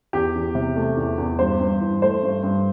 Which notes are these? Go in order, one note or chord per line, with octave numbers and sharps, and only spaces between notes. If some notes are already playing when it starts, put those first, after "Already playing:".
E2 G4
E2
C3
A3
E2
E2
G2 C5
G2
E3
A3 C5
G2
G2